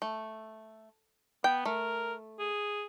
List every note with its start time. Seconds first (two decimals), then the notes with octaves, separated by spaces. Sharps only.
0.02 A3
1.44 B3 G5
1.65 A3 A#4
2.39 G#4